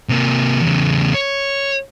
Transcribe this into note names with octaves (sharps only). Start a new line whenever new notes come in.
C3 A#3
E2 C#3
C#5